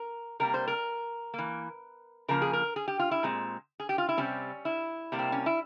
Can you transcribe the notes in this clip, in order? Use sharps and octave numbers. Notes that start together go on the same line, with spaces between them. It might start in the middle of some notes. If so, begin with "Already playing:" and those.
Already playing: A#4
C3 G3 A#3 A#4
C5
A#4
E3 A#3
C#3 F3 A#3 A#4
G#4
A#4
G#4
G4
F4
E4
A#2 G#3 C4
G#4
G4
F4
E4
C3 G3 C4 C#4
E4
C3 G3 A#3
C4
C#4
E4